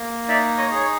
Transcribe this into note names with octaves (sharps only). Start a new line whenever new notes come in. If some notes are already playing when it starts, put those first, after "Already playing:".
Already playing: A#3
D#4 D5 E5
C#5 D#5
G#4 C#5